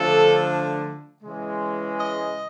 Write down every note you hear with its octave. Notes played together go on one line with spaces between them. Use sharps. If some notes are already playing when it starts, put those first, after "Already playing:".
Already playing: D3 F3 A3 D4 A4
C#3 E3 G#3
D#5